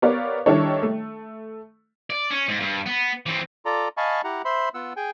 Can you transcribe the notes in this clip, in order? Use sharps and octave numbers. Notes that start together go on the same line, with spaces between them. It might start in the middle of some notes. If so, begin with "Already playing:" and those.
B3 G4 A#4 C#5 D5 F5
D#3 G3 D4 E4 A4 C#5
A3
D5
C#4
G#2
G2
B3
E3 C4
F4 A4 D5 A#5
D#5 F5 G#5 A5 B5 C#6
E4 G4 F#5 A#5
C5 E5 B5 C6
B3 F4 F#5 E6
G#4 G5 G#5